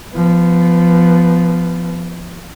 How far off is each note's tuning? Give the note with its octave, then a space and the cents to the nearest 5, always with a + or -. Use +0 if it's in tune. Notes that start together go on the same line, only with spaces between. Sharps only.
F3 -15 B3 +10